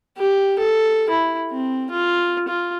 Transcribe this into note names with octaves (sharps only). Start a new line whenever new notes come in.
G4
A4
E4
C4
F4
F4